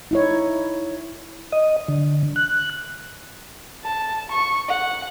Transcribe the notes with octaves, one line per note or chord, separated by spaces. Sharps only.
D#4 E4 C#5
D#5
D3
F#6
A5
C#6
F#5